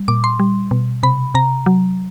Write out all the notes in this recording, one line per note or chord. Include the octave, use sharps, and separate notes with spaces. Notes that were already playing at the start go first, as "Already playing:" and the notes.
Already playing: G3
A#2 D6
C6
G3
B2
C3 B5
C3 A#5
F#3